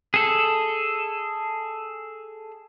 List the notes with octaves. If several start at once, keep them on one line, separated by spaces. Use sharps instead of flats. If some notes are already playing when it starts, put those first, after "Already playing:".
G#4 A4